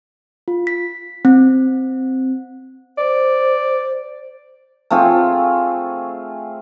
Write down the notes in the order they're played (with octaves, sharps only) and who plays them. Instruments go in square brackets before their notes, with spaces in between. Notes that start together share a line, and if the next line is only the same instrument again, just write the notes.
[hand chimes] F4
B6
C4
[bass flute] C5 [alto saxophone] D5
[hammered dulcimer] A3 C4 F4 G#4